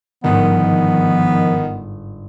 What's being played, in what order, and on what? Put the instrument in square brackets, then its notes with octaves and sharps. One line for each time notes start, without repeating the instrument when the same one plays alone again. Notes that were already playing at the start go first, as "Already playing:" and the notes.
[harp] G1 G#2 [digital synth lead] D#3 [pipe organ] F3 [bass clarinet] B3